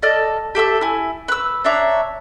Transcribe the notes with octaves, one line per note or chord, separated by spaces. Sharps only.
A4 D5 D#5 F6
G4 A4 E5 E6
E4 G#5
B4 E6
D4 C#5 E5 A#5